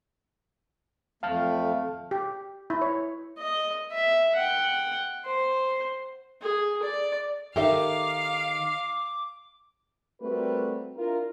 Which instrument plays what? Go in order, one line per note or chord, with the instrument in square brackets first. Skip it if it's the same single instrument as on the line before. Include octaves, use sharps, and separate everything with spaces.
[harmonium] F2 A3 [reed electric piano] F5 A5 F6
[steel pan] G4
E4
C#5
[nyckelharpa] D#5
E5
F#5 G5
C5
G#4
D5
[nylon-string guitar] D#3 D#4 G4 [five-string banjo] A4 A#4 E5 [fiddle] F5 [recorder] D6
[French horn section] G3 A3 C4 F#4 A#4 B4
D4 E4 F4 A#4